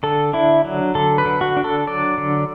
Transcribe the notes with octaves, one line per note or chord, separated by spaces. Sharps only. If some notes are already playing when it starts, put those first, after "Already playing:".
D3 A4
D4 E4
F#3
D3 A4
B4
D3
F#4
D4
A4
F#3 D5
D3